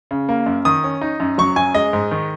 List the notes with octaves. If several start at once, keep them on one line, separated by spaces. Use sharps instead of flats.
C#3
A#3
F#2
D#3 D#6
C#4
D#4
F#2
F#3 C#6
F#2 G#5
G#3 D#5
G#2
D#3